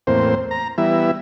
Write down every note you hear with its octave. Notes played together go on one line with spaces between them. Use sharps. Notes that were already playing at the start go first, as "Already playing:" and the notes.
E2 A2 A#3 C4 C5
A#5
E3 G3 B3 E4 E5